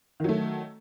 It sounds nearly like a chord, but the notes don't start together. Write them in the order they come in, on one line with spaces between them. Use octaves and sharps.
D#3 F#3 A3